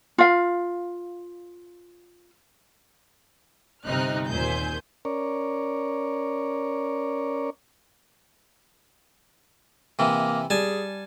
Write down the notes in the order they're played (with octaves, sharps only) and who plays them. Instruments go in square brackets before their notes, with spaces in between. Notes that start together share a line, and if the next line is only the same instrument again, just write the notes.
[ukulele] F4 F5
[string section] G1 C3 D#4 D#5 F6 F#6
D#2 A#2 C5 G#5 G6
[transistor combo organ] C#4 A#4 C#5 D5
[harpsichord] C3 E3 [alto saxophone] A#3
[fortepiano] G3 [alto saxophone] G#4 [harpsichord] G#5 A5